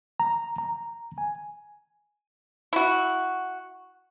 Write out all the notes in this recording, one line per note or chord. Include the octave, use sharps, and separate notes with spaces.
A#5
A#5
G#5
E4 F#4